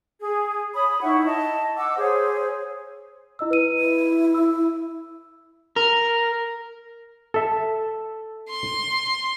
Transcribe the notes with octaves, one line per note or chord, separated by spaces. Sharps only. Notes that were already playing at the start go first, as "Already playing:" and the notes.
G#4
C#5 B5 D#6
D#4 E4 F#5 C#6
D#5 A5
F#5 D6 E6
G#4 C5 C#5
E4 D#5 E6
B4 D#7
E4
E6
A#4
A4 E5
C6